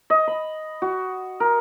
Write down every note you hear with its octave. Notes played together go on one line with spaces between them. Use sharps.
D#5
B5
F#4
A#4